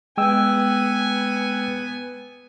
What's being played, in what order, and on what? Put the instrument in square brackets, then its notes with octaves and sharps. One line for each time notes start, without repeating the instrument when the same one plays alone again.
[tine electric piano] G#3 G5 E6 [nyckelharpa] B3 G#5